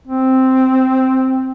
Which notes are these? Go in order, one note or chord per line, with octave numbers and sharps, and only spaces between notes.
C4